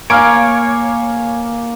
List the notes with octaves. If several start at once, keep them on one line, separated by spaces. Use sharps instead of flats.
A#3 C#5 F5 G#5 F6 D7